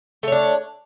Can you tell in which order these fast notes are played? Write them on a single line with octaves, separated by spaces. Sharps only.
A3 C#5 D4